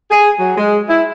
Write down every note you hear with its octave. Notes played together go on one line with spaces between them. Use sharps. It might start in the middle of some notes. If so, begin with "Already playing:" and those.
G#4
F#3
G#3
E4